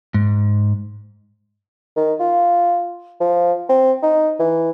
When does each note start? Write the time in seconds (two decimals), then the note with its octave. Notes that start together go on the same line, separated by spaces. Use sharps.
0.14 G#2
1.97 D#3
2.20 F4
3.21 F3
3.69 C4
4.03 D#4
4.40 E3